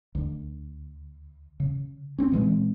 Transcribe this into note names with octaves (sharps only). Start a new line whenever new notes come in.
D2
C#3
C4 C#4
A#2 E3 G#3 C4